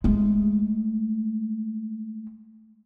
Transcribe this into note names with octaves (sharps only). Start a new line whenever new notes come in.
G#3 A3